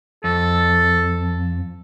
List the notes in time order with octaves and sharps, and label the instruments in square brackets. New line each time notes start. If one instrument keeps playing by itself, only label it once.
[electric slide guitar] F2 [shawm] A4